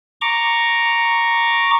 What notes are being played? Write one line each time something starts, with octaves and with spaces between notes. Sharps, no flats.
A#5 C#6 D6